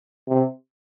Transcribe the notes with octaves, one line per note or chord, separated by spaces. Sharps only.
C3